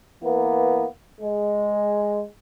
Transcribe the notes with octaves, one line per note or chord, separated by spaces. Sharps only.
E3 A#3 B3
G#3